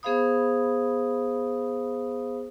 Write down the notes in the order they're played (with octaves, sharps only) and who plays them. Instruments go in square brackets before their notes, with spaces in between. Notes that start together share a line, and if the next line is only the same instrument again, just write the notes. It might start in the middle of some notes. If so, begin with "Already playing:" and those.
[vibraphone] B3 G#4 C5 F5 B5 D#6